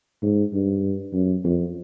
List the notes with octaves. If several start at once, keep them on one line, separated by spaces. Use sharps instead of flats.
G#2
G2
F#2
F2